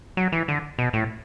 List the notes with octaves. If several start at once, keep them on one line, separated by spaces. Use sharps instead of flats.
F#3
E3
D3
B2
A2